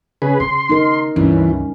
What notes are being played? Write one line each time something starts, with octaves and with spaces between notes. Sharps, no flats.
C#3 G#4 B4
C#3 C6
D#4 A#4
C#2 G2 E3 C#4